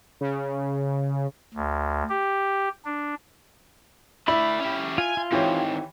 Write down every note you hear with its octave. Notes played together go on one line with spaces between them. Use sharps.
C#3
D2
G4
D4
A3 E4 D5 B5
C#4 G4
F4 G#5
F4
D#3 E3 C4 G4 C#5